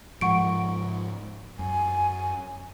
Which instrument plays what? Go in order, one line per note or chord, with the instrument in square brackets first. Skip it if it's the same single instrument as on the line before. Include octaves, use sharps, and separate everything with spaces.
[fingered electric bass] G#2 F3 [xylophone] F#5 C#6 D7
[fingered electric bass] F#2 [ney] G#5